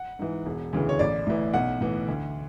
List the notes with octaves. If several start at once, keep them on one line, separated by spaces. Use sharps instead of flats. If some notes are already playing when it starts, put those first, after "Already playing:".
Already playing: F#5
G#2 E3
E1
D2 C#3 E3
C#5
A1 D5
A2 E3
B1 F#5
A2 E3
D2